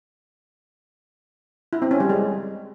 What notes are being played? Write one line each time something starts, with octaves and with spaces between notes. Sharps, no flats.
E4
C4
C#4
G3
G#3